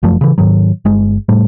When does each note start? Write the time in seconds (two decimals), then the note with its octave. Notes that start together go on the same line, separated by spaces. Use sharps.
0.03 F#1 F#2 F3 A3
0.21 C#3 E3
0.38 G#2 D#3 F#3
0.85 G1 G#3
1.29 A2 G3 A3